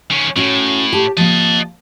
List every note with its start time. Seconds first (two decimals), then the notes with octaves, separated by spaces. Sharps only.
0.11 D#3 C#4
0.36 A2 C#4 F#4
0.93 G4 A5
1.17 F3 A#3 D#5 A5